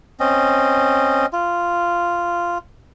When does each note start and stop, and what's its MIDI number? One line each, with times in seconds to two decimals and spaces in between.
0.20 1.26 60
0.20 1.26 61
0.20 1.26 75
1.33 2.58 65